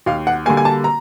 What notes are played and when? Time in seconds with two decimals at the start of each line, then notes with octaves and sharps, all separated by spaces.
0.06 D#2 F5
0.27 F#5
0.46 D3 G3 A#3 G#5
0.57 G#5
0.65 A5
0.84 A#5